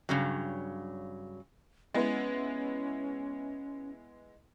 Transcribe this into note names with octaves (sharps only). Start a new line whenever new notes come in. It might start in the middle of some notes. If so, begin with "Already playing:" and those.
G2 C#3 F#3
G#3 B3 C#4 E4